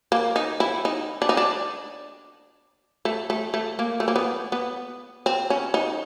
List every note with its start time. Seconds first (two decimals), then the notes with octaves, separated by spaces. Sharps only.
0.12 A#3
0.36 D#4
0.60 E4
0.85 D#4
1.22 D4
1.29 D#4
1.37 D4
3.05 A3
3.30 A3
3.54 A3
3.79 A#3
4.00 A3
4.08 A#3
4.16 B3
4.52 B3
5.26 C4
5.50 C#4
5.74 D#4